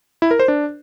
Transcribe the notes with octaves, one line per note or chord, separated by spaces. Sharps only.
E4
A#4
C5
D4